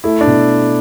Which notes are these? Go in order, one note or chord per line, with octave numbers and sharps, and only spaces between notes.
A3 E4
D4
B2